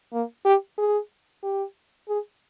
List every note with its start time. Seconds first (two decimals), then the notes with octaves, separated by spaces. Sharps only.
0.13 A#3
0.45 G4
0.78 G#4
1.43 G4
2.09 G#4